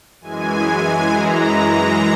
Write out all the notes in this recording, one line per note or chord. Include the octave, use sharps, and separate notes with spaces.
F#2 E3 G#3 G#5
F#2 E3 G#3 A#5